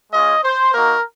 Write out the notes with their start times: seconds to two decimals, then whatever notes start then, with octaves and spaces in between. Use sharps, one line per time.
0.12 G#3 C#4 F4 D#5
0.44 C5
0.74 A#3 D#4 F#4 A#4